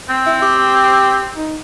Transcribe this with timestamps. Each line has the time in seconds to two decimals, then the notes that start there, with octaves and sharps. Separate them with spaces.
0.09 C4
0.26 E4
0.42 G4
1.36 D#4